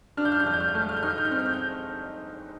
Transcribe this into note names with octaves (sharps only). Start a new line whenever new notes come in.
D4 F6
G6
F6
G6
F2 F6
G6
F6
G6
A3 F6
G6
F6
G6
D#4 F6
G6
F6
G6
C4 F6
G6
F6
G6